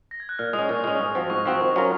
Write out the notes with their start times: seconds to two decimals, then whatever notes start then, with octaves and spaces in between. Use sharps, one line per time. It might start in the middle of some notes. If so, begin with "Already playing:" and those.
0.11 A#6
0.20 G#6
0.29 F#6
0.39 A#2 F6
0.53 G#3 D#6
0.59 C#4
0.69 A#2 C#6
0.84 G#3 C#4
0.99 G#2 D#6
1.15 F3 C4 F#4
1.30 G#2 C#6
1.45 F3 C4 F#4
1.61 D#3
1.76 F#3 C#4 F4 A#4